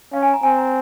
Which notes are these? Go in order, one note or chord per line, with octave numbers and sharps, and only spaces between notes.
C#4 F5
G#5
A#5
C4 G#5
A#5